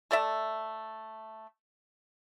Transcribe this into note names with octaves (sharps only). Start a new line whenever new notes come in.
A3 A4 D5 E5